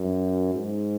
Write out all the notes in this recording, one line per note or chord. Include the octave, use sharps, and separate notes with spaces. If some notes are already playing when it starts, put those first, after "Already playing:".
Already playing: F#2
G#2